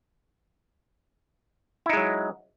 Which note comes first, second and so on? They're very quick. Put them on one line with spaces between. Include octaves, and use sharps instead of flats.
E4 D#4 G#3 F#3